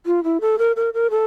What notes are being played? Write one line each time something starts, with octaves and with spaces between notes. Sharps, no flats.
F4
E4
A4
A#4
A#4
A#4
A4